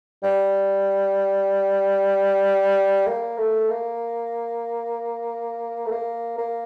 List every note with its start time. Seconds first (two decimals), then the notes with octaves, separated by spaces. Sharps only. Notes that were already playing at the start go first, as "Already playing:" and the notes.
0.23 G3
3.07 A#3
3.38 A3
3.70 A#3
5.86 A3
5.91 A#3
6.38 A#3